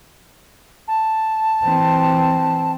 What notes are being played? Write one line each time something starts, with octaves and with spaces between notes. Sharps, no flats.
A5
E3 C4